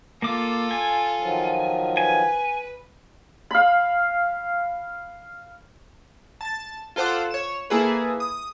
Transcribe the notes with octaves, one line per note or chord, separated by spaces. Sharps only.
A#3 F4 A4 D6
G#5
D#3 F3 F#3
B4 G#5
F5 B5
A5 A6
F4 A4 C5 F#5 D6
C#5 E7
A#3 E4 G#4 A4 B4
D#6